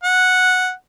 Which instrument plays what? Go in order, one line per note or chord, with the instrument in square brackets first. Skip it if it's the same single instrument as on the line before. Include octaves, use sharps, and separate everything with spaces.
[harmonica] F#5